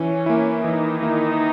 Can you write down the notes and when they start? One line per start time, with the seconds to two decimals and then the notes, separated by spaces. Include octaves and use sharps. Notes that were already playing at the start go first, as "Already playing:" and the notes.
Already playing: E3 C#4
0.26 A#3 E4
0.64 D#3 E3 D#4
1.03 A#3 E4